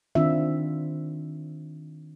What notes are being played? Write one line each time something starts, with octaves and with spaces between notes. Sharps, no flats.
D#3 C4 D4 F4 E5